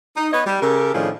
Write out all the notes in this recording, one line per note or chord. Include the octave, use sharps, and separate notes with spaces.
D#4
B3 B4 C#5 D#5
G3
C#3 G4 A4 A#4
A2 D#3 F3 C#4 D4 G#4